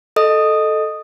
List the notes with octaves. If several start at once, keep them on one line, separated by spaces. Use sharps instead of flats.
A4 D#5 D#6